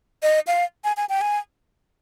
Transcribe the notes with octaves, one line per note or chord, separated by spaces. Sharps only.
D#5
F5
G#5
G#5
G5
G#5